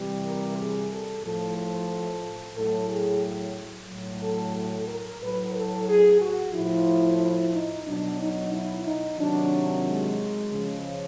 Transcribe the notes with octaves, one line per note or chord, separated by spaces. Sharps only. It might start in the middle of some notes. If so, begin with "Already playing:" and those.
Already playing: C3 E3 G3
A#4
G#4
A4
A2 F3 A4
A4
A2 F#3 A4
G#4
A2 F#3
A4
A4
A#4
A2 F#3 B4
A4
G#4
F#4
A2 F3 E4
E4
D#4
B2 F#3 D4
D#4
E4
D#4
C3 D#3 F#3 D4
G#3
C#3 F3